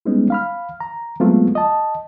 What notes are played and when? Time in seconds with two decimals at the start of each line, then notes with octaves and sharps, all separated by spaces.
0.05 G3 G#3 B3 C#4 D#4
0.30 F5 B5 F6
0.80 A#5
1.20 F#3 G#3 A3 B3 C4 F4
1.55 D#5 A5